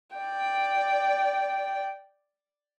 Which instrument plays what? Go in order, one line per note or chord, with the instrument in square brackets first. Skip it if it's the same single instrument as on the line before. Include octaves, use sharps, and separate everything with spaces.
[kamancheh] D5 G5